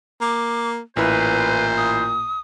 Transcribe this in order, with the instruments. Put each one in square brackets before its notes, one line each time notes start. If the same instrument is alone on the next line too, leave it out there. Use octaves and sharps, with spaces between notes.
[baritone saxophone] A#3 [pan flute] D6
[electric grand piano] A1 E4 [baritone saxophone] A#2 [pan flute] B4 [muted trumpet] C5
[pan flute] D#6